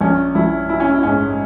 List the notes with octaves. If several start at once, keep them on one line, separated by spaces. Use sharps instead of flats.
A#1 C#4
A#1 E4
E3 E4
C#4
E4
G#2 C#4